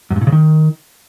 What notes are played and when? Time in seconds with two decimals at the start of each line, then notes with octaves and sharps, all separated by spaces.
0.10 F#2
0.16 G2
0.21 A#2
0.27 C#3
0.32 D#3